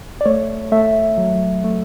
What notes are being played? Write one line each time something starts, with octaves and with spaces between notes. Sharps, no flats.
D5
A3 C#5
A3 E5
F#3
A3